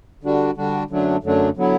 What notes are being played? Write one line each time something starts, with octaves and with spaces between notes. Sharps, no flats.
D3 G3 D4 F#4
D3 G3 D4 F#4
F#2 D3 F#3 A3 D4
F#2 D3 F#3 A3 D4
D3 F#3 B3 E4